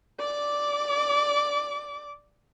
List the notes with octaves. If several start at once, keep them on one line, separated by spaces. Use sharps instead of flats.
D5 D6